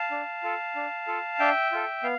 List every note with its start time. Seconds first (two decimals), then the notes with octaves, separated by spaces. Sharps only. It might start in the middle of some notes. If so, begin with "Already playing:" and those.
Already playing: F5 A5
0.11 D4
0.43 F4 A4
0.75 D4
1.07 F4 A4
1.39 D4 E5 G5
1.72 F4 A4
2.03 B3 F5